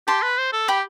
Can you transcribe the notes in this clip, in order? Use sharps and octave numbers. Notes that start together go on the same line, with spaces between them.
G4 A5 C6
B4
C5
A4
G4 G5 B5